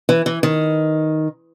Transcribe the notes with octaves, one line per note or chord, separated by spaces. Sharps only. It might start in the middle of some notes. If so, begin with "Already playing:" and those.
E3
E3
D#3